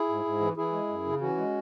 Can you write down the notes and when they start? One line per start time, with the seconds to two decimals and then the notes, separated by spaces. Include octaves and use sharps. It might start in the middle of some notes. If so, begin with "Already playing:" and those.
Already playing: E4 G#4
0.09 G#2
0.25 G#2
0.40 E3
0.56 E3 E4 G#4
0.72 G#3
0.88 F#2
1.05 C#3
1.20 E3 C#4 F#4
1.37 G#3